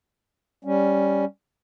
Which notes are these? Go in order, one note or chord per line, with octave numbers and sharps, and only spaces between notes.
G3 C#4